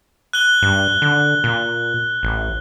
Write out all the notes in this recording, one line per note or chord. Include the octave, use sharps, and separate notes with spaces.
F#6 G7
G2
D3
A#2
A1